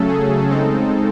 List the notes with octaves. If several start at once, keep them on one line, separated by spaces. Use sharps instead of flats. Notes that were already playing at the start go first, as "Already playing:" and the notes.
Already playing: C#3 F#3 A3 C#4 A4
G#4
C#3 G#3 C4 D#4 A4